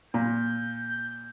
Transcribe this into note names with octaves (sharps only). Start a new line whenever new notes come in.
A#2 G6